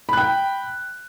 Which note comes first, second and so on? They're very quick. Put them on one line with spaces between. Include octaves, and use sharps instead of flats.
B5 F#6 G5